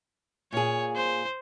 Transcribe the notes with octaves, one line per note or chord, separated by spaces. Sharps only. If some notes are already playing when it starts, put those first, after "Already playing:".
A#2 G#4 C#5
C5